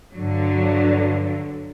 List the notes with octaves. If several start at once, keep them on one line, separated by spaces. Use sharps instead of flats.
G2 D3 F#3